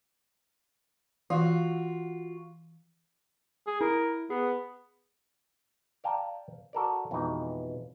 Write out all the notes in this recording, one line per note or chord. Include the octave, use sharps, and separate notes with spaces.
E3 F4 F#4
G#4
E4 A#4
B3 G#4
D5 F5 G5 A5 A#5
F#4 A4 A#4 D5
F2 B2 E3 G#3 D#4